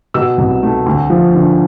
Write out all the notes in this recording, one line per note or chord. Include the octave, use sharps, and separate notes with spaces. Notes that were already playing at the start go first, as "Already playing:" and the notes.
B2 E6
C2
A3
D2
F3
D3